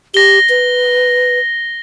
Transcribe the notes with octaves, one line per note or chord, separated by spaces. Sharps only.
G4 A#6 G7
B4